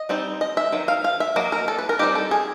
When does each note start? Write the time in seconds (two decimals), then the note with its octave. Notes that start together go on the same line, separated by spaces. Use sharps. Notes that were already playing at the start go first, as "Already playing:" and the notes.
Already playing: D#5
0.09 G3 C4 D#4
0.41 D#5
0.57 E5
0.72 D#3 F#3
0.88 F5
1.04 F5
1.20 E5
1.36 F#3 A#3 D#5
1.52 A#4
1.68 A4
1.79 B4
1.89 A#4
1.99 G3 C4 D#4 G4
2.15 A4
2.31 G#4